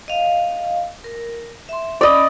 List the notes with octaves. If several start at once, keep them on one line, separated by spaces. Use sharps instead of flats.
D#5 F5
A#4
E5 C6
C#4 D5 D#5 B5 E6